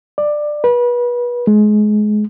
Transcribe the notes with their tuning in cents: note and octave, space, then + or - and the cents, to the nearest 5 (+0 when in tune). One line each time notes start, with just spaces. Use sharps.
D5 +15
B4 -30
G#3 +25